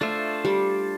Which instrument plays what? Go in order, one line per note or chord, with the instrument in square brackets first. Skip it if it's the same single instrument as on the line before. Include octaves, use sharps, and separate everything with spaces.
[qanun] A3 [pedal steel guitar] D4 F4 C5 E5
[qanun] G3